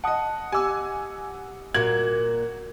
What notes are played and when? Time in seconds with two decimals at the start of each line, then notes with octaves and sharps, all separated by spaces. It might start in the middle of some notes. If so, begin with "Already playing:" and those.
0.04 D#5 F#5 A5 D#6
0.52 G4 G#5 D6 E6
1.75 A#2 F#4 G#6 F#7